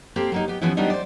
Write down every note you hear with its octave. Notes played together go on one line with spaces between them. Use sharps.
A#3 C4 G4 A4 C5
F#3 A#3 D#4
B3 G4
E3 F3 B3 C#4 E4
D#3 F#3 G3 B3 D4 D#4
C5 D5